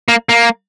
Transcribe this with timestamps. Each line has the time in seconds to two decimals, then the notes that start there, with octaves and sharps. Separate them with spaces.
0.08 A#3
0.29 A#3